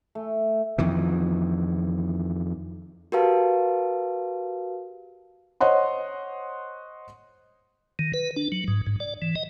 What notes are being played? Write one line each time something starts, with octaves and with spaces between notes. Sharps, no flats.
A3
F2 D#3 E3
F#4 G4 A#4 B4 F5 A5
C5 C#5 D#5 F#5 C6
D#3
B4
D4
F#3
G#2
G#2
D5
E3
D#5